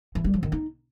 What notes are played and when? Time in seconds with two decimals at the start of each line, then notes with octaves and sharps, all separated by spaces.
0.15 E3
0.24 G3
0.34 F3
0.43 D#3
0.52 D#4